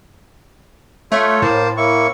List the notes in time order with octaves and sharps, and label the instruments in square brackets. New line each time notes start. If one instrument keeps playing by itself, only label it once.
[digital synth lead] A3 [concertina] F4 A4 C#5
[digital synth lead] A2 [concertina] A#3 C5 A5
[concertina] A#3 E4 C#6